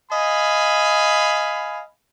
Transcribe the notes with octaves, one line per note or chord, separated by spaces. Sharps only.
D#5 F5 G#5 B5